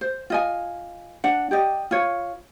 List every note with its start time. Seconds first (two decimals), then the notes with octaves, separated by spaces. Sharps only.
0.01 C5
0.30 F4 D#5 G#5
1.24 D4 F#5
1.51 G4 D5 D#5
1.91 F4 C#5